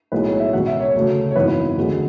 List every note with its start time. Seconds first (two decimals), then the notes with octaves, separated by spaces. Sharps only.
0.12 B1 A2 G#3 B3 B4
0.26 C#5
0.39 E5
0.53 C#2 B2 F#3 C#4 F#5
0.67 E5
0.80 C#5
0.94 D2 C#3 F#3 A3
1.31 C#5
1.36 G#1 F#2 E3 B3 B4
1.77 E1 D2 D3 G#3